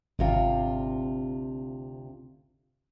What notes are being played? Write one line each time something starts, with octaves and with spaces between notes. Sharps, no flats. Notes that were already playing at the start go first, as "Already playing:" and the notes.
G#1 D2 C3 F4